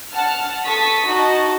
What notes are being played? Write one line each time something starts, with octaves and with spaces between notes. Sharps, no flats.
F#5 A5 F6
A4 A5 C#6 D#6 B6
D#4 F#4 D#5 A5